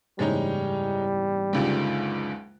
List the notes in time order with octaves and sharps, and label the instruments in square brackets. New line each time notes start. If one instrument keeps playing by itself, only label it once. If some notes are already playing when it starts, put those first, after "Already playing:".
[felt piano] F#1 E2 G#2 [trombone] G3 [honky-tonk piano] G#3 C#4 D#4
[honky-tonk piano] F#1 C#2 D3 [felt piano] G#3 D#4 F4